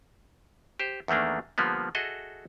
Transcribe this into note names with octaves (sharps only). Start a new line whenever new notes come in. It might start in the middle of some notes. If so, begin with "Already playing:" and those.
G4 C5
E2 D#3 A3 A#3 D4
D3 F3 G3 A#3 B3
F#4 G#4 A4 D#5 E5